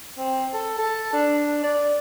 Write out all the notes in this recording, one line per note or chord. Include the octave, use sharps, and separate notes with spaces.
C4
A4
A4
D4
D5